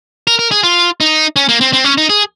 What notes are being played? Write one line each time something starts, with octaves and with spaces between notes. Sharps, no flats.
A#4
A#4
G#4
F4
D#4
C#4
A#3
C4
C4
C#4
D#4
G#4